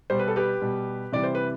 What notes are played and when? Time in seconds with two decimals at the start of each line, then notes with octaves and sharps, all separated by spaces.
0.10 B2 G3 C5
0.19 B4
0.28 A4
0.36 G4 B4
0.62 B2 G3
1.12 C3 E3 G3 D5
1.24 C5
1.35 B4